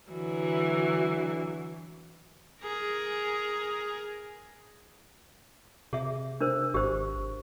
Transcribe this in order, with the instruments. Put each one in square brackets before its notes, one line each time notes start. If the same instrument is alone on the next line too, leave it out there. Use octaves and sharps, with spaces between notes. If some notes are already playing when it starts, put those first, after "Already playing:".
[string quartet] D3 E3 F#3
[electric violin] G#4 A#4
[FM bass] C3 [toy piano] G#4 E5
[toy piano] D4 A#4 C5
[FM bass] G#1 [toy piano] G4 C5